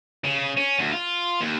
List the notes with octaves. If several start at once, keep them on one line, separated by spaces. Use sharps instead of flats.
C#3
C#4
D2
F4
D#2